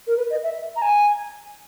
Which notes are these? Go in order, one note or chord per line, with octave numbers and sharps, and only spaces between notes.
A#4
B4
D#5
E5
A#5
G#5